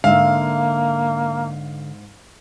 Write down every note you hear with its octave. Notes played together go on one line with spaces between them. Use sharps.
G#2 D3 A#3 E5 F5